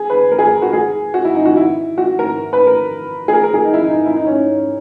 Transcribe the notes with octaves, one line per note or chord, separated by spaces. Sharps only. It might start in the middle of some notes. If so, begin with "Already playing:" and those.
Already playing: G#4
B4
A#4
G#4
A#4
F#4
G#4
F#4
E4
D#4
F#4
E4
F#4
A#4
B4
A#4
G#4
A#4
A#4
G#4
D#4
E4
D#4
E4
D#4
C#4